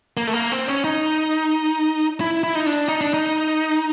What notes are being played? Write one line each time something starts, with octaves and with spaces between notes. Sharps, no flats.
A#3
A3
A#3
C4
C#4
D#4
E4
E4
D#4
D4
D#4
D4
D#4